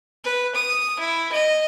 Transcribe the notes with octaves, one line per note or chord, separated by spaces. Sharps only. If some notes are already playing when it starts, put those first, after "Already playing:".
B4
D#6
E4
D#5